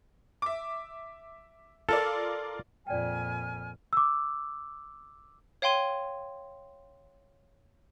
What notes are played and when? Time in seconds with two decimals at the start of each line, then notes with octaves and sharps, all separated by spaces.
0.42 E5 D6
1.89 F4 A4 A#4 D5
2.87 F2 A#2 D5 G5 G#5 F6
3.93 D6 E6
5.62 C#5 F5 G5 C6 D#7